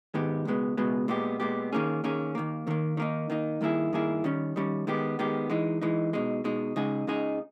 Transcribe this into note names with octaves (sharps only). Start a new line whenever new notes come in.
G#2 D#3 G#3 B3 G4
C#2 B2 G#3 B3
C#2 B2 G#3 B3
A#2 G#3 B3 G4
A#2 G#3 B3 G4
D#3 A#3 C#4 G#4
D#3 A#3 C#4 G#4
D#2 D#3 A#3
D#2 D#3 A#3
D#3 A#3 D#4
D#3 A#3 D#4
G2 D#3 A#3 E4 G#4
G2 D#3 A#3 E4 G#4
D#3 G3 C#4
D#3 G3 C#4
D#3 G#3 B3 G4
D#3 G#3 B3 G4
E3 G#3 D#4
E3 G#3 D#4
B2 G#3 D#4
B2 G#3 D#4
C#2 C#3 G#3 D#4 G#4
C#2 C#3 G#3 D#4 G#4